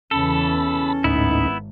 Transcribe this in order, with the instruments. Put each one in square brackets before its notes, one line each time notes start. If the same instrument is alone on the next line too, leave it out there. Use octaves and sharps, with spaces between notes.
[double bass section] E2 C#3 E3 [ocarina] C#4 [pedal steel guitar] A4 [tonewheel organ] A5 B5
[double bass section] G#1 [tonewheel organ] D2 A2 D#4 [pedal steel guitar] B3 E4